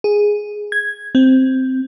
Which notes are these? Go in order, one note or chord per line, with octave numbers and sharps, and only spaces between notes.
G#4
G#6
C4